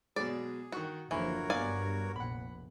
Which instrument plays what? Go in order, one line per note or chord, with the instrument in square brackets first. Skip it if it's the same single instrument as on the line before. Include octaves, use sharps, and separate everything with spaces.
[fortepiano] B2 F#3 G#3 [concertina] G#4 [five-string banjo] D5
[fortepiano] D#3 C#6 F#6 [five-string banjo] F#4
[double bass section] F#1 D#2 F3 [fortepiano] D3 [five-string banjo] E3 [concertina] F#4 A#4 C#5
[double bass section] G2 B3 [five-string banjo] D5 F5 G#5
[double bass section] F1 A#1 [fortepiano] F#5 B5